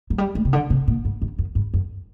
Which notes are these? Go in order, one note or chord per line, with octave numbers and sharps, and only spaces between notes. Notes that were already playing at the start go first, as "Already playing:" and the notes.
F#3
G3
A3
C3
D3
C3
A#2
G2
G2
F#2
G2
F#2